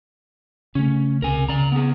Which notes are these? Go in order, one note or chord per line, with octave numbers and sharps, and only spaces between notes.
C#3 A3 C#4
C#2 C3 A#4 G#5
C#3 D5 A#5
B3 G#4